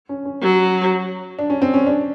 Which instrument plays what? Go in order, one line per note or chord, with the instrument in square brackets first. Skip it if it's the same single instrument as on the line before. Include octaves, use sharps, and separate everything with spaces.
[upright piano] C#4
C#4
[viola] F#3
[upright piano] D4
C#4
C4
C#4
D4